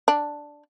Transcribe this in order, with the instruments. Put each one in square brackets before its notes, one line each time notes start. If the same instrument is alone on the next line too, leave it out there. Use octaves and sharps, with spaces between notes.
[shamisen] D4